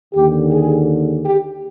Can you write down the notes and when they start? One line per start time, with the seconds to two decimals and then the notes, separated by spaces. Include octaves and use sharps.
0.14 D#2 D3 G4
0.50 G#4
1.25 G4